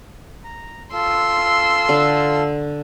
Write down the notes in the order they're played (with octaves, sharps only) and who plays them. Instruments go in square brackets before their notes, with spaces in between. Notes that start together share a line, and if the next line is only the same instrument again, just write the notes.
[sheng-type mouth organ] A#5
[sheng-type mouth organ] F4 A4 [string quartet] C6 E6
[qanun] D3